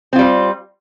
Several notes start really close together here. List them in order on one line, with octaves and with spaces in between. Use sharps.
C4 F4 G3